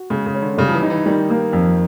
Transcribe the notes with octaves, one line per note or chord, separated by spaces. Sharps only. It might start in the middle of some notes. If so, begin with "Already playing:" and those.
Already playing: F#4
C#3 G#3
C#3
C#4
D3
C#3 G3
F3
E3
D#4
E3
D#3 G3
A#3
F2